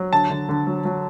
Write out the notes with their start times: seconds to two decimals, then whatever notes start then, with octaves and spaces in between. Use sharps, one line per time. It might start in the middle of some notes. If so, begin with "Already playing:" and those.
Already playing: F#3
0.13 D3 A5
0.30 D3
0.49 D3
0.67 F#3
0.85 F#3